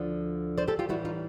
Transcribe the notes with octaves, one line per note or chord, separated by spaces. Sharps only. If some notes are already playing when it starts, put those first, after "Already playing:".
Already playing: D2 D3 F3
C5 D5
G4 A4
F4 G4
A2 E3 G3 E4 F#4
D#4 F4